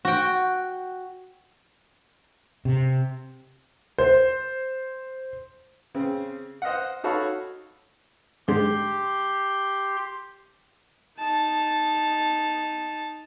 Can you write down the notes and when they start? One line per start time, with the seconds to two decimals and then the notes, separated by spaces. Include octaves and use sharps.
0.05 F#4 G5
2.65 C3
3.98 C5
5.95 C#3 C4
6.62 C5 D#5 F5 F#5
7.04 D#4 F#4 A4 C#5 F5 B5
8.48 G#2 D3 G#3 G4 C6
11.19 D#4 A5